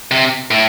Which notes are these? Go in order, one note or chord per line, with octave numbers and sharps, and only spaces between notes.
C3
A2